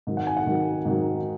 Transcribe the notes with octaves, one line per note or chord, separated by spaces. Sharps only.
G#2 D#3 F#3
F#5
G#5
F#5
G#2 D#3 F#3
G#2 D#3 F#3